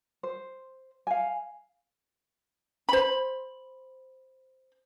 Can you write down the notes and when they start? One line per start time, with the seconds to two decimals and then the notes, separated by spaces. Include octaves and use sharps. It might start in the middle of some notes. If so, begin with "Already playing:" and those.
0.23 C5
1.07 F5 G#5
2.89 C5 B5